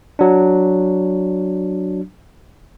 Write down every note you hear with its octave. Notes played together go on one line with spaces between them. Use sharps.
F#3 D4